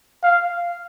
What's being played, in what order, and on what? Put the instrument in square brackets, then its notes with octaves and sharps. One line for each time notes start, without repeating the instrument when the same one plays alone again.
[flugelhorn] F5